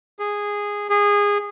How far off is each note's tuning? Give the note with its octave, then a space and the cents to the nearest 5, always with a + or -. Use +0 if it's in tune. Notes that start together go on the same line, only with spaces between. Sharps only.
G#4 -10
G#4 -20